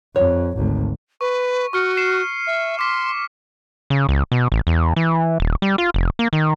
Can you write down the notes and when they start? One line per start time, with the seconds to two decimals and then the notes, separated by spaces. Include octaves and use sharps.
0.16 F2 C#5
0.57 G#1 D2
1.21 B4 C#6
1.73 F#4 C#6 F6 C#7
1.97 C7 C#7 E7
2.47 E5
2.79 C6 D6 B6
3.90 C#3
4.09 C#2
4.32 B2
4.52 A1
4.67 E2
4.96 E3
5.40 D#1
5.62 G3
5.78 F4
5.94 F1
6.19 A#3
6.33 D#3